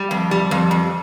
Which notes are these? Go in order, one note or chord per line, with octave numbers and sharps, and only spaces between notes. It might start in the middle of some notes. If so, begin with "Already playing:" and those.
Already playing: G3
F2
G3
F2
F2